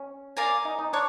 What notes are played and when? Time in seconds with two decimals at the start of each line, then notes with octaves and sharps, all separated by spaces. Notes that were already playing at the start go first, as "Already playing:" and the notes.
Already playing: C#4
0.37 A#4 D5 F5 G#5
0.65 D#4
0.79 D#4
0.93 D4 C#5